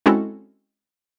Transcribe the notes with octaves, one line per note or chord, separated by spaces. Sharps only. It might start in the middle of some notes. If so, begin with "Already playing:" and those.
G#3 C4 C#4 E4 F#4 A4